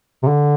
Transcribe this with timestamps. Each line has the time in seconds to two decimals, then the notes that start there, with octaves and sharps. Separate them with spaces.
0.23 C3
0.27 D3